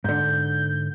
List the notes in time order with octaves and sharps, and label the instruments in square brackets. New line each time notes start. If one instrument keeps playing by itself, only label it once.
[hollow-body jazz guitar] G#2 D3 [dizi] G6